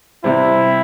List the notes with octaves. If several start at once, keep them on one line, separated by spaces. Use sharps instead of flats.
C3 G3 C4 E4